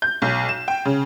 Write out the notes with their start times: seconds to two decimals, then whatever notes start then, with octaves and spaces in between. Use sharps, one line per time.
0.02 G6
0.22 B1
0.49 E7
0.68 G5
0.85 C#3